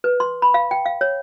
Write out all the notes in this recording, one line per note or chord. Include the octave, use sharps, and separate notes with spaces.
B4
C6
B5
F5
G5
F5
C#5